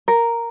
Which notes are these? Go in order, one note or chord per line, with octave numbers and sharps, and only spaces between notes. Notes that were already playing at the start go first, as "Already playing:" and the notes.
A#4